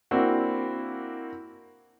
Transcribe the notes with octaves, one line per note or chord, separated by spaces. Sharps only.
A#3 C4 D4 E4 F#4